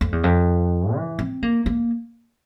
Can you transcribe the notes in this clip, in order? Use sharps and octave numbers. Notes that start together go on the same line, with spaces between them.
F2
E2
F2
E3
C4
A#3
A#3